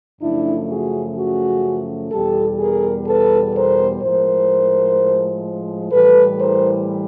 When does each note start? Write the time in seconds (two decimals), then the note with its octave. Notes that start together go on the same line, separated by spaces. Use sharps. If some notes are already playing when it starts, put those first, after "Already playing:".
0.22 F#2 C#3 F3 A3 D4 E4
0.69 F#4 G#4
1.17 F#4 G#4
2.12 E2 B2 G3 G4 A4
2.60 G#4 A#4
3.07 A4 B4
3.54 A#4 C5
4.02 A2 F3 G#3 A#4 C5
5.91 A2 E3 G3 A4 B4
6.39 A#4 C5